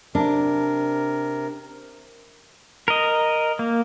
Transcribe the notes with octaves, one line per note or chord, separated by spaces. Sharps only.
C3 D4 A#4
A#4 D#5
A#3